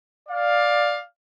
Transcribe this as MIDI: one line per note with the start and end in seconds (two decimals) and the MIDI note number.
0.29 1.00 74
0.29 1.00 77